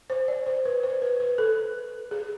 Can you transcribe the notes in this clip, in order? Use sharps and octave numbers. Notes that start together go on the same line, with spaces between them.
C5
D5
C5
B4
C5
B4
B4
A4
G#4